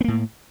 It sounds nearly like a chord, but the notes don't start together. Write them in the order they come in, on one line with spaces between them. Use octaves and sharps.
B3 A#3 A2